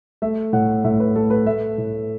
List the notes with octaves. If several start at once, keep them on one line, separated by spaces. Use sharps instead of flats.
A3 E5
A2 F#5
A2 E5
B4
A3 A4
B4
A3 E5
A2